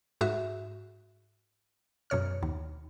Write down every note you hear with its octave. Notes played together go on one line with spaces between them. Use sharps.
G#2 F#4 E5
F#2 B2 C#5 F6
D#2